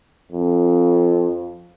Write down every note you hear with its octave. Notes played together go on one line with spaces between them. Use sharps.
F2